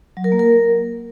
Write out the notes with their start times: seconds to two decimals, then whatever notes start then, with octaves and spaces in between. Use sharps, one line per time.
0.17 F#3
0.24 A#4
0.32 A#3
0.39 A#4